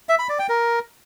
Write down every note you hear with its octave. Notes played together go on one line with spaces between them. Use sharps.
E5
B5
D5
G5
A#4